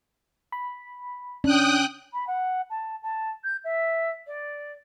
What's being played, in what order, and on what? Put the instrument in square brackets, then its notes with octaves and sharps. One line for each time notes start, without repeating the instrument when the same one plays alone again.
[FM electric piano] B5
[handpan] C#4 [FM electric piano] D4 [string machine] G5 D#6 F#6
[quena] B5
F#5
A5
A5
G6
E5
D5